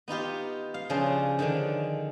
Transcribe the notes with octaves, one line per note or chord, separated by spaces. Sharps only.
B3 D#4 F4 G4
F5
C#3 F3 D4 G#4 C5
D3 D#3 F3 D4